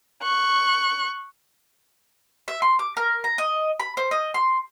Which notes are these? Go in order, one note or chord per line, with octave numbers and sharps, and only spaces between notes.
C#6 F#6
E5
C6
D6
A#4
A#5
D#5
B5
C5
D#5
C6